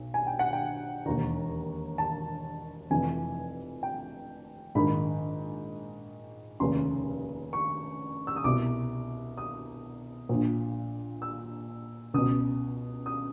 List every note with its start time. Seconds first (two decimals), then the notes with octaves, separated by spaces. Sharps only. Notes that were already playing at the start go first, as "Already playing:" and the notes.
Already playing: B1
0.14 G#5
0.27 G5
0.39 F#5
0.53 G5
1.06 E1 D#2 D#3 A#5
1.98 A5
2.90 F1 F2 C3 E3 G#5
3.83 G5
4.75 A#1 G#2 D#3 B5
6.60 F1 D#2 C#3 C6
7.53 C#6
8.27 E6
8.36 D#6
8.44 C2 B2 D6
9.38 D#6
10.29 A#1 A#2
11.22 E6
12.14 C#2 B2 D#6
13.06 D#6